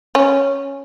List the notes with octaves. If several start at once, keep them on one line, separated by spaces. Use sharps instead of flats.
C#4